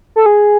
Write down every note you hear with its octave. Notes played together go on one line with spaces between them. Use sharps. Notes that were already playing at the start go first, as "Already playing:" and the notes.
A4
G#4